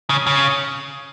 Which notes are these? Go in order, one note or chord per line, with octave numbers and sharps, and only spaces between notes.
C#3
C#3